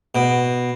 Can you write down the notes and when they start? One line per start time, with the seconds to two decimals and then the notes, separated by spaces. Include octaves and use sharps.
0.15 B2